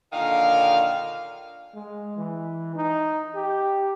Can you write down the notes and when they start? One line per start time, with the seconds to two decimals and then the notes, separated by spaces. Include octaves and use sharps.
0.13 A#2 D3 D#3 F5
1.75 G#3
2.17 E3
2.75 D#4
3.35 G4